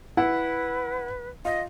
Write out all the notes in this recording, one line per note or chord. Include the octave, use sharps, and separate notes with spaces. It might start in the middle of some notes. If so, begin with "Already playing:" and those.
E4 B4 F#5
F4 D#5